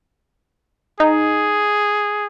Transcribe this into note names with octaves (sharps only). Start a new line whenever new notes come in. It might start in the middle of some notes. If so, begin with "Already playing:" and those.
D#4 G#4